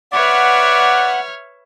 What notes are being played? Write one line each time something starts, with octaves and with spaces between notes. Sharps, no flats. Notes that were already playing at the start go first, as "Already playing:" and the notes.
B4 C#5 D5 E5 F#5 F6